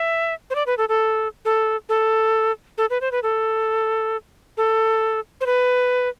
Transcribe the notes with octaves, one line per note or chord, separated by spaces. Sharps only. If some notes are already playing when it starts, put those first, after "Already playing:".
Already playing: E5
C5
D5
B4
A4
A4
A4
A4
A4
B4
C5
B4
A4
A4
C5
B4